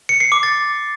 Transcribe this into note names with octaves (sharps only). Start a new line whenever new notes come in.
C#7
C7
D6
A6